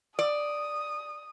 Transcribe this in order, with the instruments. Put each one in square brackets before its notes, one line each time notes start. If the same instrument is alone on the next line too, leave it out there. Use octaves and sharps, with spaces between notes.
[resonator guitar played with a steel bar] D5 [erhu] D#6